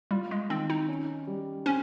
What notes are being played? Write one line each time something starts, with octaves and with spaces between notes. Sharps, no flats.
G3 F4
G#3
D#3 C4
D#4
C#4
G3
C4 C#4